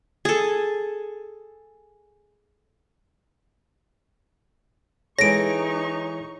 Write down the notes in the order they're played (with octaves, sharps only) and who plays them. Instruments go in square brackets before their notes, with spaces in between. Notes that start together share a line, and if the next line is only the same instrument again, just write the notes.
[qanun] G#4 A4
[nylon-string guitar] E3 G#3 A4 [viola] D#4 C#6 [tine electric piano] C#5 [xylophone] A#6 D7